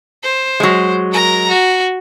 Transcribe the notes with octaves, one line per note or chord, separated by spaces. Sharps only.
C5
F#3 G#3
A#4 A#5
F#4